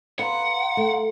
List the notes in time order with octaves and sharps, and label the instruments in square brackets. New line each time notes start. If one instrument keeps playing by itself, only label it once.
[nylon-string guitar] B4 [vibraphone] F5 A#5 C6 [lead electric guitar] F#5
[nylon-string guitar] A3